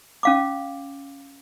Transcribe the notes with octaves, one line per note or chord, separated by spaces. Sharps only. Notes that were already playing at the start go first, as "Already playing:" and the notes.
C#4 F5 D6